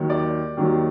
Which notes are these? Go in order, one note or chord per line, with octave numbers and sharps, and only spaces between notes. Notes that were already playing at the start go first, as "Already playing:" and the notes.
Already playing: D#2 D#3 F#3
D5
D#2 D#3 F#3